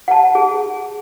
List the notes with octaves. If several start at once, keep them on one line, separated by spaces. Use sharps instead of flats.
F#5 A5
G#4